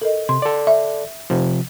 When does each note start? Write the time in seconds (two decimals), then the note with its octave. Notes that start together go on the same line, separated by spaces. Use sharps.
0.02 A4 A#4 D#5
0.29 C3 C6
0.42 A4 D5
0.67 E5
1.30 C3 F3